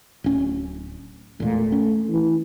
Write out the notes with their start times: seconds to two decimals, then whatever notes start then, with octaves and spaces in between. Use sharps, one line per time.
0.24 D1 C#4
1.40 E1 A#2 A3
1.72 C#4
2.09 E3